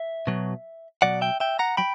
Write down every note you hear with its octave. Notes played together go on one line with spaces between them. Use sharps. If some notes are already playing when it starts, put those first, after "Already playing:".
Already playing: E5
B2 F#3
B2 F#3 D5 F#5
E5 G5
E5 G5
F#5 A#5
F#3 G5 B5